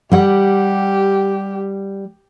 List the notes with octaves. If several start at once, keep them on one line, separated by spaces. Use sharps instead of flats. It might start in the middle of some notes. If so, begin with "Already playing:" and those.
G3 G4 F#5